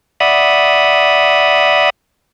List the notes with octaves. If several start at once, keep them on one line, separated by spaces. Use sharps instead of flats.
D5 E5 F#5 B5 D#6